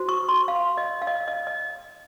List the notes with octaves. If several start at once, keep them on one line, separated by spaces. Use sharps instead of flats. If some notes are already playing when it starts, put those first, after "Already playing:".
Already playing: F#4 C5
C#6
C6
F5
D#5
F5
D#5
D#5
D#5